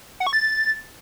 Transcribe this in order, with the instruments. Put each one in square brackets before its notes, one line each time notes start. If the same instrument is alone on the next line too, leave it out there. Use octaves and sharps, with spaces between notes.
[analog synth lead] F#5
C#6
A6